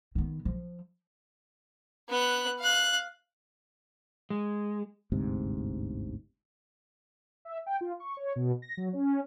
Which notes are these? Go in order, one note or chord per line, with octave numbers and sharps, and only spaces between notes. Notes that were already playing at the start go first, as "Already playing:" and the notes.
D#3 B3
F3
B3 F#6
F5 F#6
G#3
G1 D2 G#2 C3
E5
G5
F4
C#6
C#5
B2
A#6
F#3
C#4